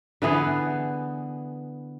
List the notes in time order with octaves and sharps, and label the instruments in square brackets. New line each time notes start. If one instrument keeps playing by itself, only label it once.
[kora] D3 E3 B3 G#4